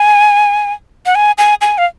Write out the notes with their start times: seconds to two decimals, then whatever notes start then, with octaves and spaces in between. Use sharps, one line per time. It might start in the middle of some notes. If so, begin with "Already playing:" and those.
Already playing: G#5
1.06 F#5
1.15 G#5
1.38 G#5
1.61 G#5
1.78 F5